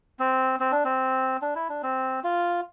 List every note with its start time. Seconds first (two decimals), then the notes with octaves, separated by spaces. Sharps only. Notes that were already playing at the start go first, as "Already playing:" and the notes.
0.19 C4
0.60 C4
0.72 D4
0.85 C4
1.42 D4
1.55 E4
1.69 D4
1.83 C4
2.24 F4